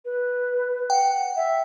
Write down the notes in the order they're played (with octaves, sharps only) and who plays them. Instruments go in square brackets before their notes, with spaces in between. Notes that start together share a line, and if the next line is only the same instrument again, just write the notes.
[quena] B4
[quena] F#5 [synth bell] G5
[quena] E5